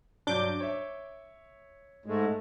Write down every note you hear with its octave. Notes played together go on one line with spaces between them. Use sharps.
G2 F#3 D4 D6 G6
C#5 E5
G#2 G#3 A3